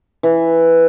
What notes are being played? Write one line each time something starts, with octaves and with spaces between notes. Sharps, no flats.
E3